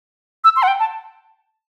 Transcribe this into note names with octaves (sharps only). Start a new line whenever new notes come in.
E6
C6
F#5
G5
A5